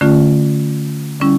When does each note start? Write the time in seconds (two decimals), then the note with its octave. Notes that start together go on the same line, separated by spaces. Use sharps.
0.01 D3 A3 C#4 F4
1.20 D3 G3 C#4 E4